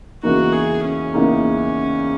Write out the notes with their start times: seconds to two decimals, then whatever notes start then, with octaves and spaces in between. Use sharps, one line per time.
0.23 E2 C#3 E3 A#3 D#4 F#4
0.53 G#4
0.84 C#4
1.14 E2 C#3 E3 A#3 D#4